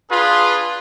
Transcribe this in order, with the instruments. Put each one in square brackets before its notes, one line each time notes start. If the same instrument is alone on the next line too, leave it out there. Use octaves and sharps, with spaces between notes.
[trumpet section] D4 F4 G#4 B4